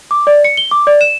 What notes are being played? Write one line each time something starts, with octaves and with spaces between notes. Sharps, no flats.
D6
D5
C#7
G7
D6
D5
E7